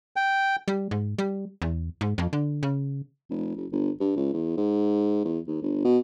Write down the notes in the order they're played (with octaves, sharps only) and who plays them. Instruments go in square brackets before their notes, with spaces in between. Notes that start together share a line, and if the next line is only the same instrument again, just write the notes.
[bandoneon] G5
[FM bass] G3
G#2
G3
E2
G#2
F2
D3
C#3
[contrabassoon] F1
F#1
G1
G2
C#2
E2
G#2
E2
D#2
G1
B2